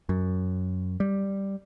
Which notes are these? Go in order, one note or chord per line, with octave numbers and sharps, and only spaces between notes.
F#2
G3